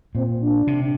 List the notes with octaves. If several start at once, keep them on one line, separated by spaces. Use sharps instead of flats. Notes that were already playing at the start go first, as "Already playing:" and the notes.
A#2 C4
D4
C3